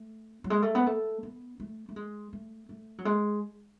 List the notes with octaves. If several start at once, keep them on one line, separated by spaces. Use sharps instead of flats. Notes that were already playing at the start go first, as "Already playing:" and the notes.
Already playing: A3
F#3
G#3
A3
B3
A3
B3
A3
A3
G#3
A3
A3
F#3
G#3